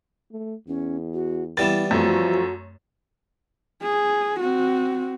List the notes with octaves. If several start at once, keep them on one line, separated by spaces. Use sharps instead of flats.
A3
E2 C#4
F#4
E3 G3 B3 E4 A6 E7
F#2 F3 A3 F#4
G#4
C4 F#4